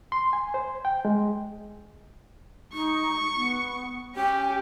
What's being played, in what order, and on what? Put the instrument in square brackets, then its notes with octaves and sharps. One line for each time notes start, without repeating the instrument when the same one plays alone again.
[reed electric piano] C6
G#5
C5
G5
G#3
[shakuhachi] D#4 [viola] C#6
[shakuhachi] B3
[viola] C#4 G4 [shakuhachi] G5